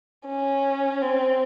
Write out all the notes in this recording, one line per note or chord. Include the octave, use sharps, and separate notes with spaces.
C#4
C4